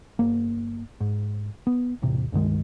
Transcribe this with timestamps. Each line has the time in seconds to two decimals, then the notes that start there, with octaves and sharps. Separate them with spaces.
0.19 G1 A#3
1.00 G#2
1.67 B3
2.02 E1 A1 C3
2.32 C#2 G2 D#3 G#3